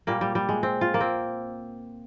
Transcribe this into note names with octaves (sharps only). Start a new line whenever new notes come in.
A#2 G3 A#3
G3
G3
G#3
C4
F4
A#3
C4